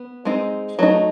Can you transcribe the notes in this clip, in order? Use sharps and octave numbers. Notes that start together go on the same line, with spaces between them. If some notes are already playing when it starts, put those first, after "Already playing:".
Already playing: B3
G#3 C4 D#4
F#3 A3 D#4